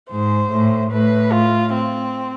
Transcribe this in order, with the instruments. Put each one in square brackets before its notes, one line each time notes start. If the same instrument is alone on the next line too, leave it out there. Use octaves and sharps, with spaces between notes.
[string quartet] G#2 [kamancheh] C5
[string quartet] A2
[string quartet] A2 [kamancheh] B4
[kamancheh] F4
C4